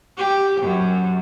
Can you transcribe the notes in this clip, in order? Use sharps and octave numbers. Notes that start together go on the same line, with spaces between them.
G4
F#2